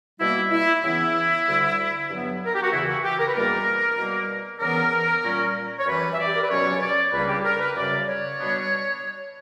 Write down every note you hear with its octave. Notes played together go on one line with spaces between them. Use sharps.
B2 G3 A#3 E4
E4
C#3 E3 B3 E4
D2 D3 G3
G2 F#3 B3
A#4
G4
F#4
E2 C#3 E3 E4
F#4
G4
A#4
B4
E2 B2 G3 A#3 D4 A#4
B2 G3 A#3
C#3 E3 B3 D4 A#4
A#2 G3 C#4
C#5
F#2 E3 G3 B4
E5
D5
G4
A#4
B4
C#2 B2 F#3 C#4 C#5
C#5
D5
C#2 C#3 G3 A#3 D4 B4
G4
A#4
B4
F#2 C#3 G3 D5
C#5
B2 G3 B3 D4